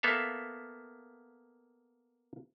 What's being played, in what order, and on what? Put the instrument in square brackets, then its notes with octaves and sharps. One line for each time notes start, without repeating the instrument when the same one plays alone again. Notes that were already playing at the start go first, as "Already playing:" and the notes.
[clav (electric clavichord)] A#3 B3 A4 E5 F5